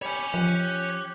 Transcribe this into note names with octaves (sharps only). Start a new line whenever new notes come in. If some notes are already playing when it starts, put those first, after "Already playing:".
G4 C#5 G#5 B5
F3 G4 F#6